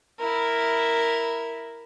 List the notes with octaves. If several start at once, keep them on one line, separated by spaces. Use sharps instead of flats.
E4 A#4